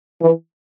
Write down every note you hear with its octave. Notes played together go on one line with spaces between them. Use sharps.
E3